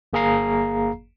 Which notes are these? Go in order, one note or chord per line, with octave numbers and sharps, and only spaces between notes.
G1 A#3 G#4 F5 A#5 C7